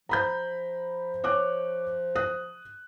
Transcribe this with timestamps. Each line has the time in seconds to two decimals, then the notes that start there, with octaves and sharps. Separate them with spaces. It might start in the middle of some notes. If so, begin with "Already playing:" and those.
0.09 F3 A#5 B5 G6
1.24 C#5 D6 F#6
2.16 D#6 F#6